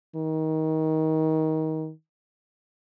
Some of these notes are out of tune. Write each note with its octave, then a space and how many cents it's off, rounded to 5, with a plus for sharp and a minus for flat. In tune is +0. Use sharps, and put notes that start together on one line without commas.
D#3 +25